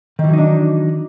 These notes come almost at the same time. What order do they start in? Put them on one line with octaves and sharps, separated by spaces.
D#3 E3 F#3 D#4 D4